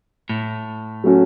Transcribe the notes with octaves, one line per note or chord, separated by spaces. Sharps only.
A2
F#3 A3 C#4 F#4